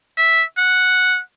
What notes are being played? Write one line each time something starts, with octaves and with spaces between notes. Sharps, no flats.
E5
F#5